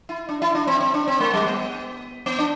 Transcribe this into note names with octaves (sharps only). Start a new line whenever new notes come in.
E4
D4
E4
D4
C4
C4
D4
C4
A3
G3
B3
B3
D4